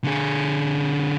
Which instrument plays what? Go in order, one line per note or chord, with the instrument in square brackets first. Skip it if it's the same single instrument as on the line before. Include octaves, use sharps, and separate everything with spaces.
[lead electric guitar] D3 G#4